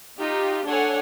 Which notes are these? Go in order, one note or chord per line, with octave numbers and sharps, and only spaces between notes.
D#4 F4 G4
D4 A4 C#5 F#5 G#5